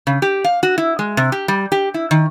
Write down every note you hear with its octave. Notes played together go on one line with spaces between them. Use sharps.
C#3
G4
F5
F#4
E4
G#3
C3
G4
G3
G4
E4
D#3